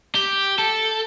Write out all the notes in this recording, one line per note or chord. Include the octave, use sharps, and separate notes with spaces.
G4
A4